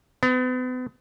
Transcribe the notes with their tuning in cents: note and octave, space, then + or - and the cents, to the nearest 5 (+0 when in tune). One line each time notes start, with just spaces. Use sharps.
B3 +40